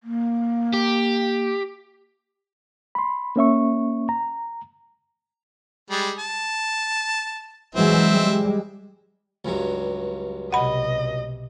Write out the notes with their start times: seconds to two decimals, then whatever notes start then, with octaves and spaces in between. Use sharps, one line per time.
0.04 A#3
0.73 G4
2.95 B5 C6
3.36 A#3 C#4 E5 C#6
4.09 A#5
5.90 G3 G#3
6.19 A5
7.75 E3 F#3 G#3 C4 E5
8.09 G3 G#3
9.45 C#2 G2 F#3
10.52 B1 C3 D#5 F#5 B5